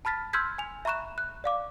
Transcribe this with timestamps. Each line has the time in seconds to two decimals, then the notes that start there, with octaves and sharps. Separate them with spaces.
0.05 A5 B5 F6 A6 B6
0.33 C6 E6 F6 G6 G#6 B6
0.58 G#5 F7
0.85 E5 A#5 B5 C#6 F#6 E7
1.18 F#6
1.44 D5 F5 D6